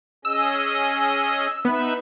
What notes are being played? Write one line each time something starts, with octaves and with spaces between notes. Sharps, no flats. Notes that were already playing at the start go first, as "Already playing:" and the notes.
C#4 G#4 D#5 E6
B3 D#4 B4 E5